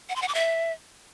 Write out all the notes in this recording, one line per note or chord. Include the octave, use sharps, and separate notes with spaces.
F#5
C6
F#5
D6
E5